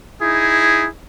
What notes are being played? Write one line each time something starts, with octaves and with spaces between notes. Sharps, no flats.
D#4 E4 G#4